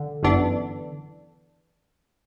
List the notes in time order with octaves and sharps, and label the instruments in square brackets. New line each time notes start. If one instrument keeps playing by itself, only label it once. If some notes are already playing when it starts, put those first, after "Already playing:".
Already playing: [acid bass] D3
[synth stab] G1 F#2 E3 B3 D4